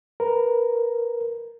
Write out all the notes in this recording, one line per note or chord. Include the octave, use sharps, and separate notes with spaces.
A#4 B4